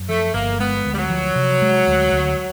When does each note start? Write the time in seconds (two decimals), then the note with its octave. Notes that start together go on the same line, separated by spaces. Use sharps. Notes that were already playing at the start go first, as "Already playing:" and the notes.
Already playing: F#2
0.09 F3 A3
0.34 G1 A#3
0.59 G#3 B3
0.86 D2
0.94 G3
0.98 F#3
1.10 F3
1.36 C3
1.62 G#3
1.87 D2
2.12 D2